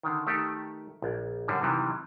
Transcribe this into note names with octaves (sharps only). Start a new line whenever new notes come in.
D3 D#3
D#3 A3 G4 A4
A#1
F#2 D3 G3
C3 D#3 E3 F#3 G3